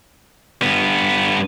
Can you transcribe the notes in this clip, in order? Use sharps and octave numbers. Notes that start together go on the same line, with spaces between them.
G2 B3